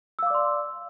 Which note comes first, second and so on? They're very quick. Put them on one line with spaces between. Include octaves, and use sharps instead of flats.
E6 F5 D6 D5 C6